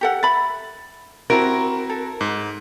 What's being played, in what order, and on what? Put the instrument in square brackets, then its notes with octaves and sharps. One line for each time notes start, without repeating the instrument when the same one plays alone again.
[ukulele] G4 A4 F#5
[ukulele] E5 B5 [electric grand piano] A6
[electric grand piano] C4 E4 F#4 [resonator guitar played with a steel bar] A#4
[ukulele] A4
[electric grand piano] G#2